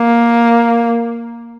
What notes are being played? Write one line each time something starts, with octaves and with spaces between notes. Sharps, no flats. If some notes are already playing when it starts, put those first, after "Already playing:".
Already playing: A#3